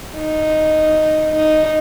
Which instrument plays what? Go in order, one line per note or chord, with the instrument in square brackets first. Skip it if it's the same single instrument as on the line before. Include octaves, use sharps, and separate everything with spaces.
[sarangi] D#4
D#4